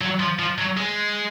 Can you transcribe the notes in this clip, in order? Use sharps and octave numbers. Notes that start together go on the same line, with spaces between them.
F#3
F3
F3
F#3
G#3